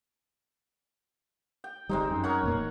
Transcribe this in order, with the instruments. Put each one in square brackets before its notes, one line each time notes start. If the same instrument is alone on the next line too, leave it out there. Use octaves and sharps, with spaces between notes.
[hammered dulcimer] G5
[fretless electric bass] G1 G3 [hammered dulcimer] G#3 C4 D#4
[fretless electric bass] F#2
[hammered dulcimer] A#4 C#5 F#5
[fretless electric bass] F2 A#2 A#3
E1